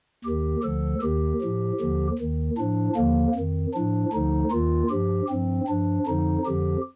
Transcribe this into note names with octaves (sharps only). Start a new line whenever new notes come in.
D#2 D#3 G4
D2 D3 F3 A4
D#2 D#3 G4
A2 F3
D#2 D3 F3
D#2 D#3
A2 F3 D4
D#2 D3 F3 A#3
F2 D#3
A2 F3 D4
D2 D3 F3 D#4
D#2 D#3 F4
G2 F3 G4
G2 F3 C4
G2 F3 D4
F2 D3 F3 D#4
F2 D3 F3 G4